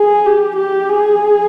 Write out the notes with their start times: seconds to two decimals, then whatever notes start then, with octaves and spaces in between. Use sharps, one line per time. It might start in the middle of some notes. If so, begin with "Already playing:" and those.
Already playing: G#4
0.26 G4
0.57 G4
0.89 G#4